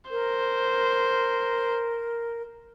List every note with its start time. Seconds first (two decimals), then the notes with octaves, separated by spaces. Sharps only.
0.11 A#4 C5